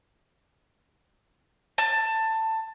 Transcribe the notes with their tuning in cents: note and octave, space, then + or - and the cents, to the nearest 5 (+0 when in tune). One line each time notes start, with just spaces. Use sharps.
A5 +15